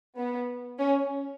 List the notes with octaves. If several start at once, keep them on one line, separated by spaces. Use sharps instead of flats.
B3
C#4